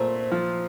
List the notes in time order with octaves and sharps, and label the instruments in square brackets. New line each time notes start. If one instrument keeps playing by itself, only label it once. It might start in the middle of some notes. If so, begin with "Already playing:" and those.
Already playing: [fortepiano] A#2 A3 [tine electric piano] C5
[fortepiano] F3